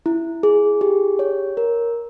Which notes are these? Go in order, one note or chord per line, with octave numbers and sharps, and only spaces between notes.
E4
G#4
G4
C#5
A#4